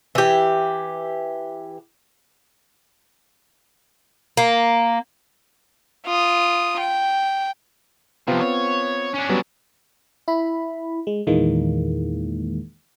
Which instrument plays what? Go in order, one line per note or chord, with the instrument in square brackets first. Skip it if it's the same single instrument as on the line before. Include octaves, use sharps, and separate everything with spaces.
[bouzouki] E3 G4
A#3
[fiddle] F4 D#6
G5
[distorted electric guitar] C3 F3 [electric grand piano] B3 C4 F4
[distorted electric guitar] C#5
C#4 D4
[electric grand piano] F#3 G3 B3
[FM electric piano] E4 B5
G#3
E2 A#2 D#3 E3 G#3 A#3